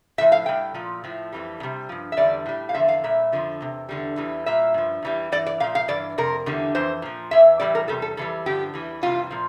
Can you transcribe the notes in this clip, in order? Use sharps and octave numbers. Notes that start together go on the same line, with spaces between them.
A2 F3 E5
F5
A2 G3 G5
A#2 F3
A2 F3
F2 E3 G3
F2
C3 G3
G2 F3
E5
E2 D3 G3 D5
A2 G3
F5
E2 D3 F3 E5
F5
A#2 G3 E5
F2 D3 F3
E2 C3
E2 D3 G3
E2 E3 G3
A#2 G3 E5
G2 F3
E2 E3 G3
G2 E3 D5
D5
A#2 F3 F5
F5
G2 E3 D5
F2 C3 A#4
E2 D3 G3
F2 E3 C5
A#2 F3
E2 E3 E5
A2 E3 G3 D5
A#4
E2 C3 G3 A4
A4
F2 E3 G3 A4
G2 D3 F3 G4
E2 E3 G3
F2 C3 E3 G3 F4
A#2 F3